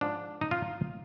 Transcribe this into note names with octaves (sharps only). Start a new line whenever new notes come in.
G#2 F3 G#3 D4
D#4
F4